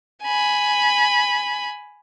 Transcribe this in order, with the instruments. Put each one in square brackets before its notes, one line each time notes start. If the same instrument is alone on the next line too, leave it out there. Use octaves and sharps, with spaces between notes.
[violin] G#5 B5